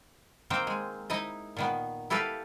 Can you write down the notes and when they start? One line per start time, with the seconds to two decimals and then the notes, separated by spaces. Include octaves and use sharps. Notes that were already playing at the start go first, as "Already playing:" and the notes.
0.50 D#3 A#3 C4 C5 G5
0.67 G#3
1.10 D#4 E4 D#5
1.57 A#2 D#3 B3
2.10 E4 G4 A4 B4 F5